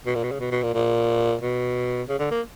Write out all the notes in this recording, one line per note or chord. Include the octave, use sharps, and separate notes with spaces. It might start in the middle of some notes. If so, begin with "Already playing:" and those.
B2
A#2
B2
C#3
B2
B2
A#2
A#2
B2
C#3
D3
A#3